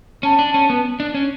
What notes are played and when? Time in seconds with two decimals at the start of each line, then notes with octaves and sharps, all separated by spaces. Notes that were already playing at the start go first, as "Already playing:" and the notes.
0.23 C#4 A5
0.39 D4
0.54 C#4
0.70 B3
1.00 D4
1.15 C#4